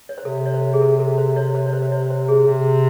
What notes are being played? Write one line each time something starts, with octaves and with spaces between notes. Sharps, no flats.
C#5
C5
C3 A4
C#5
C5
G#4
A4
A4
C5
C#5
C5
C#5
C5
C#5
C5
G#4
C3